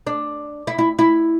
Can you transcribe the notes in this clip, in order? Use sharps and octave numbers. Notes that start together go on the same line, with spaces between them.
D4
E4
E4
E4